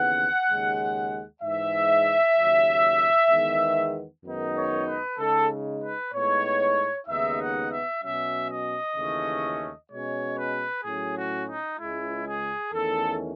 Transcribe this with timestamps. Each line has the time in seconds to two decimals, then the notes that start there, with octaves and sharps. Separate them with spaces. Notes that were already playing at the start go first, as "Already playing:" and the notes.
Already playing: D#2 C#3 E3 B3 F#5
0.48 D#2 C#3 G#3
1.42 G#2 E3 G#3 E5
2.36 D#2 C#3 F#3
3.30 E2 D#3 G#3 B3
4.25 F#2 D#3 G#3 B3 D#4
4.56 C#5
4.87 B4
5.18 C#3 G#3 D#4 A4
5.82 B4
6.12 A2 G#3 B3 D#4 C#5
7.07 D#2 C#3 G#3 B3 D#4 E5
7.39 F#5
7.70 E5
8.01 B2 F#3 C#4 E5
8.49 D#5
8.95 D#2 C#3 E3 A3 C#4
9.89 B2 G#3 C#4 C#5
10.37 B4
10.83 A2 F#3 C#4 G#4
11.15 F#4
11.47 D#4
11.78 C#2 C#3 G#3 E4
12.25 G#4
12.72 E2 D#3 A3 C#4 A4